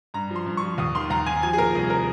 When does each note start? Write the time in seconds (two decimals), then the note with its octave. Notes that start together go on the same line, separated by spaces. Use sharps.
0.14 G2 A#5
0.31 F3
0.36 C6
0.46 G2
0.57 C#6
0.63 F3
0.78 D#2 D#6
0.95 D#3 C6
1.10 D#2 A#5
1.26 D#3 G#5
1.43 F3 G#5
1.53 G#4
1.58 A#2 A#4
1.75 C2 G#4
1.90 A#4